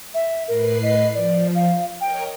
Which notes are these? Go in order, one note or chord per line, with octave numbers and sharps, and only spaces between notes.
E5
A2 A#4 B4 C7
D#5
F3 D5
F5
A#4 C#5 D#5 G5